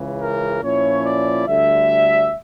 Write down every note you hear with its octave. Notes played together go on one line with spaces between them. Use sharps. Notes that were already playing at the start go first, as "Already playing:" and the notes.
Already playing: C#2 C#3 E3
A#4
A#2 F3 C#4 E4 C#5
D5
D2 D3 G3 E5